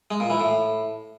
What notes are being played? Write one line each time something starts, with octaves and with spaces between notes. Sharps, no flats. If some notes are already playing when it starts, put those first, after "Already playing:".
G#3
A#2
E3
A2